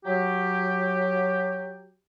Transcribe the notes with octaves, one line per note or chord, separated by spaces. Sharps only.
F#3 G4